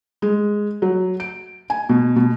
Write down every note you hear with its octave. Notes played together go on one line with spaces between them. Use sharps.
G#3
F#3
D7
G#5
B2
B2